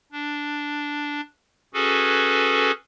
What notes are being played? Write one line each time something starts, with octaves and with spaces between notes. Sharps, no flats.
D4
C#4 F#4 G#4 A4 B4